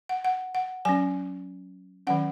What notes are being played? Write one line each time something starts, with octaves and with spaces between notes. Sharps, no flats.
F#5
F#5
F#5
F#3 C#4 G#5
D#3 F#3 C#4 F#5